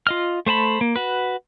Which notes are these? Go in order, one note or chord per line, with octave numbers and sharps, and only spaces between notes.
F4 D#5 F6
A3 C5 A5 B5
A#3
F#4 B4